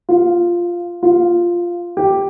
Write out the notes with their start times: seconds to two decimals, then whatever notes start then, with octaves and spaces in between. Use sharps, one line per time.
0.09 F4
1.03 F4
1.97 G4